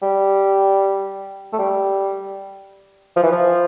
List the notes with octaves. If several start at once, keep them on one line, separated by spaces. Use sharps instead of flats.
G3
A3
G3
F3
E3
F3